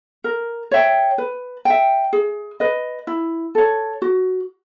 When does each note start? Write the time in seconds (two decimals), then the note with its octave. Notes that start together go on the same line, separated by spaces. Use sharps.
0.24 A#4
0.71 C#5 E5 G5
1.18 B4
1.65 E5 G5
2.13 G#4
2.60 B4 D#5
3.07 E4
3.55 A4 C#5
4.02 F#4